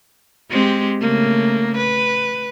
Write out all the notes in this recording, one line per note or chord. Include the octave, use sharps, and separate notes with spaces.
G#3 C4 G4
C#3 A3 A#3
B4